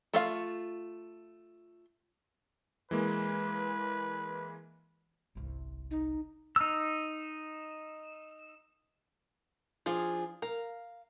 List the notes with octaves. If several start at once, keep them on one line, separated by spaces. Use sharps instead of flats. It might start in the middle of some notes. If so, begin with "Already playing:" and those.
A3 F4 F5
E3 G#3 A#3 B4
G1 C2
D#4
D#4 E6
F3 D4 F4 G#4
A#4 F5